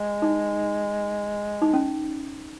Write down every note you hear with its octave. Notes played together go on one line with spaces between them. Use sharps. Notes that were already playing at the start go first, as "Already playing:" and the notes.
Already playing: G#3
D#4
D#4
C#4